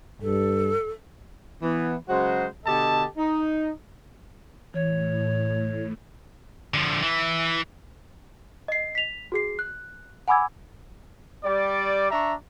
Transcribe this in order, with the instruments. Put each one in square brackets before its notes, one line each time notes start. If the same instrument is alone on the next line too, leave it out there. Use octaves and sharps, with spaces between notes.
[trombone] G2 [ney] A4
[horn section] E3 B3
C#3 F#3 G#3 F#4 C5
B2 D3 G4 A4 D#5 A5
D#4
[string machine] A2 [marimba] E3 [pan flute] C#5
[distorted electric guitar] D3 F3
E3
[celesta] D#5 C7
B6 F7
F#4 G#4 C7
F#6
F#5 G#5 B5 D6 E6 G#6
[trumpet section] G3 D5
D4 E5 A#5 C#6